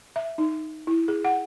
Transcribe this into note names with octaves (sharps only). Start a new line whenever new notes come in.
E5
D#4
E4
G#4
F#5